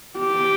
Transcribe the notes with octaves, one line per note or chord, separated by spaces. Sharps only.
G4